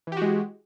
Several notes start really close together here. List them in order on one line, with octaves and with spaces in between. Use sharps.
E3 G4 F#4 G#3